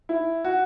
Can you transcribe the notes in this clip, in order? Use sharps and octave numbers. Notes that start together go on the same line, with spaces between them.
E4
F#4